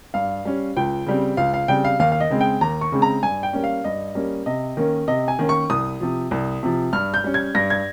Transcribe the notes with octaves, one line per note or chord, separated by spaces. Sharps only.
G2 F5
G3 C#4
C#2 G5
C#3 G3 C4
C#2 F5
F5
C#3 G3 C4 G5
F5
D#2 F5
F5
D#5
C#3 G#3 C4
G5
D#2 A#5
C#6
C#3 G#3 C4
A#5
G2 G#5
G5
G3 A#3 C#4
F5
G2 D#5
G3 A#3 C#4
C3 D#5
D#3 A#3 C#4
C3 D#5
G#5
D#3 A#3 C#4
C#6
C2 D#6
C3 F3
C2
C3 F3
G2 F6
G6
G3 C#4
G#6
G2 A#6
G#6